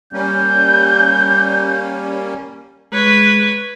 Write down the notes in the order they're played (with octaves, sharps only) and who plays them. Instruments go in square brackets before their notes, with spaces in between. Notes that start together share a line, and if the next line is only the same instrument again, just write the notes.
[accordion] G3 A#3 C#4 [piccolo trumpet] G6
[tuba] G#3 [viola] B4 C#5